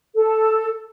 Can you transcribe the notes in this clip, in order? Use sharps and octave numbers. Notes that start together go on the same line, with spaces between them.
A4